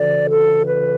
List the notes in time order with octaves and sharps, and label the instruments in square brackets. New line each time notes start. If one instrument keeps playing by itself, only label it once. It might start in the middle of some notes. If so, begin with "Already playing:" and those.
Already playing: [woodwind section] D2 C#3 E3 D5
A4
B4